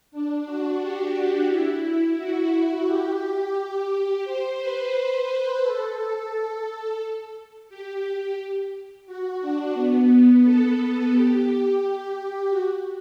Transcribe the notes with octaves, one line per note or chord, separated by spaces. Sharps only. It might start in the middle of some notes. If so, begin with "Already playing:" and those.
D4
F#4
G4
E4
F#4
G4
C5
B4
B4
B4
A4
G4
F#4
D4
B3
A4
G4
F#4